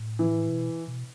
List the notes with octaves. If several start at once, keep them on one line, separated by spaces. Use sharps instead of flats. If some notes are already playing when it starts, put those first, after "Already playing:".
Already playing: A2
E3
B2
B2